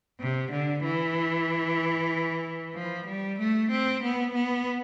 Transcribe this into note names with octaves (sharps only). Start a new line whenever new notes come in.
C3
D3
E3
F3
G3
A3
C4
B3
B3